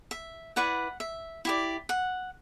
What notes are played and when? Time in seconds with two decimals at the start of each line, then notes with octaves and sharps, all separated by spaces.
0.11 E5
0.56 E4 B4 D5 F#5
1.00 E5
1.45 E4 G4 D5
1.89 F#5